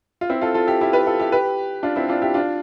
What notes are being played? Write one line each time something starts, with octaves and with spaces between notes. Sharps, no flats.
F4
C4 E4
F4 A4
F4 A4
E4 G4
E4 G4
G4 B4
F4 A4
E4 G4
G4 B4
D4 F4
C4 E4
D4 F4
E4 G4
D4 F4